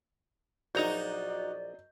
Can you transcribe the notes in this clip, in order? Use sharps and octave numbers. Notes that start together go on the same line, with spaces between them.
A#1 F#3 D#4 F#4 D5 D#5 A#5 G6